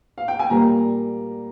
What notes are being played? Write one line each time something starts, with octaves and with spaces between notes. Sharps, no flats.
F5
G5
G#5
A#2 G3 A#3 A#5